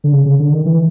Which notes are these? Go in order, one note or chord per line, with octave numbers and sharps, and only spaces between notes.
D3
C#3
C#3
D3
D#3
E3